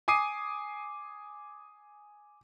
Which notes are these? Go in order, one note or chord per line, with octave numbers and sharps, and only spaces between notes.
G#5 D6 D#6 C7 D#7